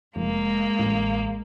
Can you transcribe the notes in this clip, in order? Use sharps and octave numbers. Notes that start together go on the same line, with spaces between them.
F1 G#3 A#3
A1